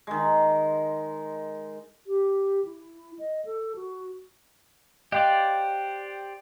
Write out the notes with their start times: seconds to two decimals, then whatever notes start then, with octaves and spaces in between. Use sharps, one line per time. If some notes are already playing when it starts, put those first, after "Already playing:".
0.07 D#3 G#3
2.07 G4
2.65 E4
3.19 D#5
3.45 A4
3.76 F#4
5.12 G4 C5 D5 D#5 F5 G5 F#6